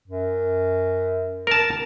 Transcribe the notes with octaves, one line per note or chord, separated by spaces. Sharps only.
F#2
A#4 A5